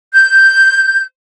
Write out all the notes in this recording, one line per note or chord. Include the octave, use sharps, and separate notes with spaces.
G6